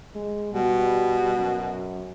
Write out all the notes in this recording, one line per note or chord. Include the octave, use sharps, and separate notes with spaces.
G#3
B2 G3
F#2